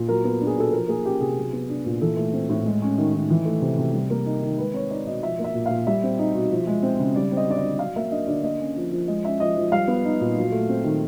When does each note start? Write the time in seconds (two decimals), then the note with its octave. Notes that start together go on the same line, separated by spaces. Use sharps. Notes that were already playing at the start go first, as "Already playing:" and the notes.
Already playing: A#2
0.08 F#3 A#4
0.24 B3
0.41 D4
0.47 G#4
0.56 B2 A4
0.73 F3 A#4
0.88 A#3 G#4
1.04 C#4 G4
1.21 C3 G#4
1.37 F#3
1.53 B3
1.69 D4
1.86 A#2
2.01 E3 A4
2.17 A3
2.33 C4
2.50 A2
2.66 G#3
2.82 C#4
2.98 D#3
3.14 D#3
3.30 E3
3.45 A3
3.62 C3
3.78 C3
3.94 G3
4.10 A#3
4.26 D#4
4.42 D#3
4.58 G#3 B4
4.74 C4 C#5
4.91 D#4 D5
5.06 B2 D#5
5.22 F3 E5
5.39 A#3
5.44 E5
5.55 A#2
5.66 A#2 F5
5.87 G3 E5
6.03 C4
6.19 D#4
6.35 B2
6.51 F3
6.67 G#3
6.83 C4
6.99 C#3
7.15 G3 D5
7.32 C4
7.37 D#5
7.48 D3 D5
7.58 D#5
7.64 D3
7.79 F#3 F5
7.96 A#3 E5
8.11 D4 D#5
8.27 D3 D5
8.43 A#3 D#5
8.59 C#4
8.76 F3
8.92 F3
9.07 G#3 D#5
9.24 C#4 E5
9.39 F3 D#5
9.56 F3
9.72 G3 F5
9.88 B3
10.05 D#4
10.21 A#2
10.37 F#3
10.52 A3
10.69 C4
10.84 D#3